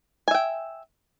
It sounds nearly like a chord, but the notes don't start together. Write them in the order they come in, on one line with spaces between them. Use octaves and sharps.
G#5 E5 G5